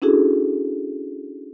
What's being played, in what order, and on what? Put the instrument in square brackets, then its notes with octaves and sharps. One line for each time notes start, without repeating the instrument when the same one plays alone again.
[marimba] C#4 D4 E4 F#4 G#4 A4